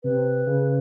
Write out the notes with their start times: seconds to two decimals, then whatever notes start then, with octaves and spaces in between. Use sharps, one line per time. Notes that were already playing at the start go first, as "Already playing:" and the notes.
0.04 C3 B4
0.47 C#3